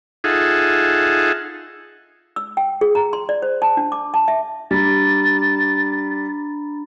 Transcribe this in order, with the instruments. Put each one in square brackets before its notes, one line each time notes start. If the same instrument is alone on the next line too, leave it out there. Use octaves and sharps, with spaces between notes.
[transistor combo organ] D#4 F4 G#4 A4 E5 F#5
[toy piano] E6
G5
G#4
A#5
C6
D5
C5
A5
D4
D6
A5
E5
[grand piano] G3 [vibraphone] D4 A#5 B5 [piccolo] A6